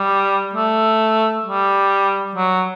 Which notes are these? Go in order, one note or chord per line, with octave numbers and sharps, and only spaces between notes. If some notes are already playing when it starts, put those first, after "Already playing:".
Already playing: G3
A3
G3
F#3